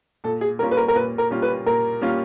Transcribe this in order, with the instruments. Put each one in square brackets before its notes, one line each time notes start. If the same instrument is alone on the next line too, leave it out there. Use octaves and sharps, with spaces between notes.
[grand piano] A#2 [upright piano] A4
[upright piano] G#4
[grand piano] G3 A#3 C#4 F4 [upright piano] A#4
[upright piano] B4
A#4
A#4
[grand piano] A#2 [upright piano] B4
[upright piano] A#4
[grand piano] G3 A#3 C#4 F4
[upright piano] B4
[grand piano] A#2 [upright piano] A#4
[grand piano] G3 A#3 C#4 F4